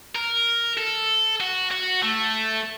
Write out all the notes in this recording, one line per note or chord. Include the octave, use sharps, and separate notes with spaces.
A#4
A4
F#4
F#4
A3